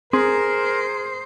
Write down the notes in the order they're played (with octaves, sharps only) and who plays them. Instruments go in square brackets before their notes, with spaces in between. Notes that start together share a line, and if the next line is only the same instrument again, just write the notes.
[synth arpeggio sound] C4 [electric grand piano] G#4 [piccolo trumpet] A#4 [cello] C5